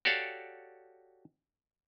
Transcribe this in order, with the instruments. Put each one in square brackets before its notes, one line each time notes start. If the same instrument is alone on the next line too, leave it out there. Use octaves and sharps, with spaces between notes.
[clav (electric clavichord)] F#4 G4 A4 C#5 D5 F5